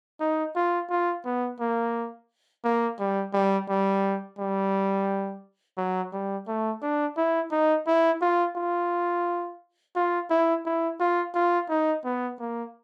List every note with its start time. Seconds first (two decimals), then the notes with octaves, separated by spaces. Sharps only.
0.20 D#4
0.56 F4
0.90 F4
1.25 B3
1.60 A#3
2.64 A#3
3.00 G3
3.33 G3
3.69 G3
4.39 G3
5.77 F#3
6.13 G3
6.47 A3
6.82 D4
7.17 E4
7.51 D#4
7.87 E4
8.22 F4
8.56 F4
9.95 F4
10.30 E4
10.65 E4
11.00 F4
11.35 F4
11.69 D#4
12.04 B3
12.40 A#3